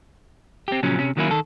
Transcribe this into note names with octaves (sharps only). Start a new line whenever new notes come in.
C4 G4
A#2 C#3 F3 F#3 C#4
C3 C#4
D#3 F#3 A#3 C#4 E4
D#3 A4